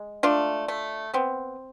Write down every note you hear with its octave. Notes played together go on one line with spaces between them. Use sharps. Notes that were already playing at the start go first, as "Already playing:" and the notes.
Already playing: G#3
A3 D4 F4
A3
B3 C4